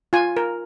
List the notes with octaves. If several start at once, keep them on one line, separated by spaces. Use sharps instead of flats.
F4 G#5
A#4